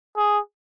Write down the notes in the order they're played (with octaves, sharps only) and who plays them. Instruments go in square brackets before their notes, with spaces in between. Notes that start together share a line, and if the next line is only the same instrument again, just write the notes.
[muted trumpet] G#4